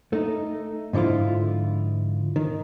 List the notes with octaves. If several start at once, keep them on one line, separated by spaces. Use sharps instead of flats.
A3 D#4
G#2 D3 F3 E4 F4
D#3